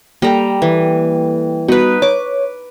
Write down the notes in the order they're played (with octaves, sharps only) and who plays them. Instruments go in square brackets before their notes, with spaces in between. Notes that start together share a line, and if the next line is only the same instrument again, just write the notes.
[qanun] G3 A#5 [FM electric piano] A#3 A4 G5
[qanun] E3
[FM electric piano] G3 B3 F#4 [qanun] D#4 B4
[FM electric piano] C#5 [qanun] D6